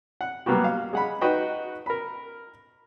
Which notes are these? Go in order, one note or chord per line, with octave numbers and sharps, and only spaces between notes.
F#5
F#3 G3 A#3 B3 F#4 G4
F5
G#3 F#5 B5
D#4 F#4 B4 D#5 G5
A#4 B5